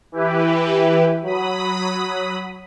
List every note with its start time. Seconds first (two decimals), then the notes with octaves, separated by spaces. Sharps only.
0.12 E3 E4 G4 B4
1.22 F#3 B5 D#6